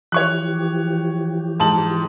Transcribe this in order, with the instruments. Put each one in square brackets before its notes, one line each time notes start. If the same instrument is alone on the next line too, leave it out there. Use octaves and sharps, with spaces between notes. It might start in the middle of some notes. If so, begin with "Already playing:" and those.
[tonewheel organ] E3 F3 G4 [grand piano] C#5 C#6 F#6
[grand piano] G#2 A5 F#7